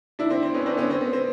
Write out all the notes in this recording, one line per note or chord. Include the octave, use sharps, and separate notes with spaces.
D4 E4
C4
C4
B3 C#4
C4 D4
B3 C#4
C4
B3
C4